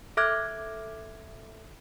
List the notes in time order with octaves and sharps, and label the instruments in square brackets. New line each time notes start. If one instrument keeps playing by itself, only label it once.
[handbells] A4 E5 D6 F6 F#6 G#6